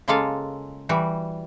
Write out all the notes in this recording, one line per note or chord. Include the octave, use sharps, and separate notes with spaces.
C#3 G#3 A#3 F4 A4 F5
E3 G3 F#4